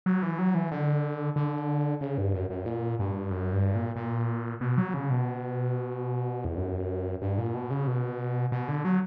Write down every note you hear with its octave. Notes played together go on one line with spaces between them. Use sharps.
F#3
E3
F#3
E3
D3
D3
C#3
G2
F#2
F#2
A#2
G2
F#2
G2
A#2
A#2
B2
F#3
C#3
B2
E2
F#2
G2
A#2
B2
C#3
B2
B2
D3
F#3